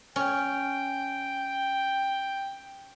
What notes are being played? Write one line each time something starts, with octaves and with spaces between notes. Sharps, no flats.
C#4 G5